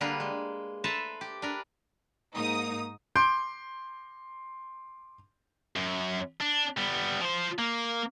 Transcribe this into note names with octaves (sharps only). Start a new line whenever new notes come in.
D3 G3 A#3 G#4 A#4 B4
G#3
A4 B4 C5 E5 A5 A#5
G4
D4 A#4 B4
G#2 A#3 D#4 D#6
C6 D6 G6 D7
F#2
D4
G3 B3
F3 C5
A#3